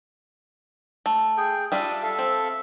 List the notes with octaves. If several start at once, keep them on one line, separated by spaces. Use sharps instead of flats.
A3
G#4 G5
G3 D4 F4 E5 D#6
A4 E5 F5
C4